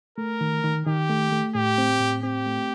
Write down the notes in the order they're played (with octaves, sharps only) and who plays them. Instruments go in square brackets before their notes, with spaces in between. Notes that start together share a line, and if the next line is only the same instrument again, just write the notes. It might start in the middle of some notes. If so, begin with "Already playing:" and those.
[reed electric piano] A3 [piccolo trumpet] A#4
[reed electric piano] D#3
D#3
[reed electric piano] D#3 [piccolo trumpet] G4
[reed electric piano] A3
A3
[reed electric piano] A2 [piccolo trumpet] G4
[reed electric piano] C4
A2
[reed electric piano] C4 [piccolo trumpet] G4
[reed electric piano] A3